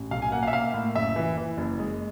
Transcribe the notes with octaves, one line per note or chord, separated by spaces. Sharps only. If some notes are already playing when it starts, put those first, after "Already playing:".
Already playing: A1
B1 F5
G#5
A#3 F#5
F5
E5
A#3 F5
A2
F#1 E5
E3
E3
F#1
G#3